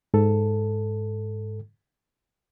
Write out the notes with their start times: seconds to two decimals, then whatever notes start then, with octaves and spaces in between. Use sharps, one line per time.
0.14 G#2 A4